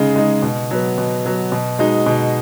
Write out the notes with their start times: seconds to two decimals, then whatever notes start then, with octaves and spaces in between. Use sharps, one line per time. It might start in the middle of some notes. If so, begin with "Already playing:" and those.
Already playing: C#3 G#3 D#4
0.16 G#3 D#4
0.42 B2
0.71 F#3 B3
0.98 B2
1.25 F#3 B3
1.52 B2
1.79 G#3 D#4 F#4
2.06 B2